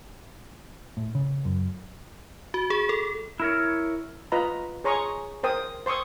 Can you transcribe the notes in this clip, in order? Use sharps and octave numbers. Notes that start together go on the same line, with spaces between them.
A2
C#3
F#2
F#4
G#4
A4
E4 A#4 C#5
F4 B4 D#5 A#5 B5
G#4 C#5 A#5 C6 C#6 D#6
A#4 C5 G5 D#6
C5 C6 C#6 D#6 E6